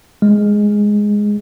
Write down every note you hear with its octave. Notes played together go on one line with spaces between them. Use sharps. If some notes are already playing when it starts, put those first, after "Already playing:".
G#3